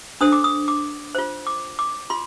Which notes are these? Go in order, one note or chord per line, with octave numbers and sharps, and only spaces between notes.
D4 A4 C5 D#6
D6
D#6
D6
F4 C5
D6
D6
F4 C6